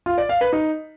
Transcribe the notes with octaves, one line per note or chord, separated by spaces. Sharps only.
F4
D5
F5
B4
D#4